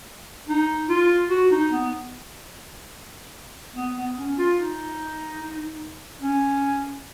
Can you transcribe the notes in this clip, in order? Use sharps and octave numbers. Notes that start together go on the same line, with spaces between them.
D#4
F4
F#4
D#4
B3
B3
B3
C#4
F4
D#4
C#4